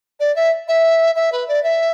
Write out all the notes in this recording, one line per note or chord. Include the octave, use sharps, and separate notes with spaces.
D5
E5
E5
E5
B4
D5
E5